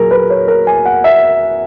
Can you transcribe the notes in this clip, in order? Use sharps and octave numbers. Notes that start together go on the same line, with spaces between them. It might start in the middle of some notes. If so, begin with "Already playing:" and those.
Already playing: A#2 F#3 G#4 A#4
B4
C#5
A#4
G#5
F#5
E5